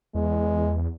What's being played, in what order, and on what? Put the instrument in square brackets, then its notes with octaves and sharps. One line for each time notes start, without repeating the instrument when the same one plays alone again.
[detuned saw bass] E2 [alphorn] G#3